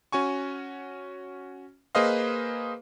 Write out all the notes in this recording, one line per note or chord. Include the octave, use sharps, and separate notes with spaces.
C#4 F#4 G#5 C#6
A#3 G#4 B4 C5 D#5 F5